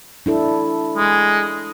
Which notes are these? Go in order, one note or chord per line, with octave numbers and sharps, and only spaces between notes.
D4 E4 A4
G#3